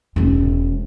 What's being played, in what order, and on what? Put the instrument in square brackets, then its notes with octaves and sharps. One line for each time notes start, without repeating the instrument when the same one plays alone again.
[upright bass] E1 C#4